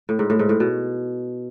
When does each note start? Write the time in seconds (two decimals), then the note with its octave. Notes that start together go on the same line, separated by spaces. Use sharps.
0.09 A2
0.19 G#2
0.30 A2
0.39 G#2
0.49 A2
0.60 B2